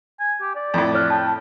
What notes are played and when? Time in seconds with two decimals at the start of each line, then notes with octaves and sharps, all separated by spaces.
0.20 G#5
0.41 G4
0.55 D5
0.74 F2 A2
0.94 C#5 F6 F#6
1.10 G5 A5